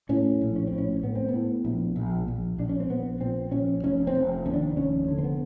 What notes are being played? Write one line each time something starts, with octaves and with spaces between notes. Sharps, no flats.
A2 C#4
A#1
C#4
C4
A2
C#4
A2 B3
C4
A2 B3
A#1
A#1
A#1
A#1 D4
C#4
C4
A#1 B3
A#2 C4
A#1 C#4
F1 C#4
C4
F1
D#2 C#4
D4
F1 C#4
D3
C4
B3